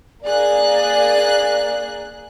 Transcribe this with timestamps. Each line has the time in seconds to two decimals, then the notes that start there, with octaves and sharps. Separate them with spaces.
0.22 A#3 G#4 D5 F#6